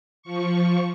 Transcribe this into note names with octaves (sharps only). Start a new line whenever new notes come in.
F3 C#6